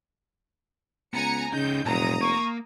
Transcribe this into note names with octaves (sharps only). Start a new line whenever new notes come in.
C#2 B3 G#5 A#5 C#7
C#2 C#3 D#4 G6
F1 A#2 F#3 A#5 D#6
A#3 C#6